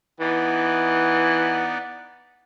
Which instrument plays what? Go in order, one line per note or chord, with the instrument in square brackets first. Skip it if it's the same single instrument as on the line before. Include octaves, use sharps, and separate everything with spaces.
[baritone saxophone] E3 [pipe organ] B3 D#4 D5 [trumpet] F#5